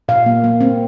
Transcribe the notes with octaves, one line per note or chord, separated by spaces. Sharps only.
A#2 F5
A#3
A#3
C4